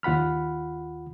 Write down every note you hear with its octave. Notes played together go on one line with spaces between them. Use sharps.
D#2 F4 F#5 B5 F6